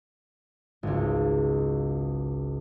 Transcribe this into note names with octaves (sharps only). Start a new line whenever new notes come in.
G#1 C#2